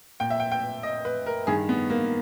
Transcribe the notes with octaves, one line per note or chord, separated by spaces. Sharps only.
A#2 G5
E5
G5
G5
D#5
B4
A#4
G2 D#3 G#4
B3
A#3